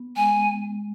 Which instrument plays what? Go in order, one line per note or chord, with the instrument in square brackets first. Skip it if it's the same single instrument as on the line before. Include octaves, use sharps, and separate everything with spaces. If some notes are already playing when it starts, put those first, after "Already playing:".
Already playing: [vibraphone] B3
[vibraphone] G#3 [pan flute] G#5
[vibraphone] G#3